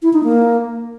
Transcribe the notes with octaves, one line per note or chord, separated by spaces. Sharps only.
E4
D#4
A#3